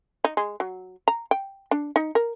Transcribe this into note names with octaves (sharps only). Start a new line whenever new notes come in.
D#4
G#3
F#3
A#5
G5
D4
D#4
A#4